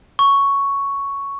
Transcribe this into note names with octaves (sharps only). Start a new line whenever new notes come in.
C#6